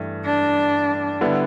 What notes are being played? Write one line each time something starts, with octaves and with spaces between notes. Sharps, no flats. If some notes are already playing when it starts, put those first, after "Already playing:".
Already playing: G2 E3 A3
D4
D3 G3 B3 E4